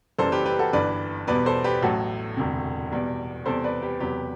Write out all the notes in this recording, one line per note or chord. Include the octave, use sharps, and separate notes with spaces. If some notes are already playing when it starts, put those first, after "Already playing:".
F#1 F#2 E3 G3 A4 C5
G4 B4
G4 B4
F#4 A4
G1 G2 E3 B4 D5
E2 B2 G3 B4 D5
A4 C5
G4 B4
A1 A2 F#3 F#4 A4
E1 D2 C3
E2 B2 G3
E2 C3 G3 A4 C5
B4 D5
G4 B4
E1 E2 C3 F#3 G4 B4